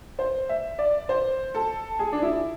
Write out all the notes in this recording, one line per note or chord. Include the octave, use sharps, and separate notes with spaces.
C5
E5
D5
C5
A4
G#4
D4
E4